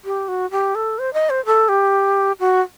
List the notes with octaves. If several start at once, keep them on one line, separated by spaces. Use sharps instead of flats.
G4
F#4
G4
A4
C5
D#5
C5
A4
G4
F#4